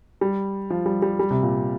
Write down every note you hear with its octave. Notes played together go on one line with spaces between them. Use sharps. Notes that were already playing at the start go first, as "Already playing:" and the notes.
G3
F3
G3
G3
G3
C3
A#2